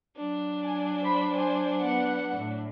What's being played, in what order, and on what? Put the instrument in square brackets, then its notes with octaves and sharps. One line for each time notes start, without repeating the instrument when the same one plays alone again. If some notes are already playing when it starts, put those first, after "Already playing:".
[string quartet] F#3 D4
[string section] G#5
C5 B5
C5 G#5
B3 F#5
A2